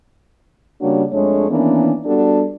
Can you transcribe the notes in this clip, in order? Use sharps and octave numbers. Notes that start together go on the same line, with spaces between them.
C#3 G3 A#3 D4 F#4 C#5
F2 G#3 A3 D4 C#5
D#3 E3 A#3 B3 C#4 D4
G3 B3 D4 F#4 G4 A4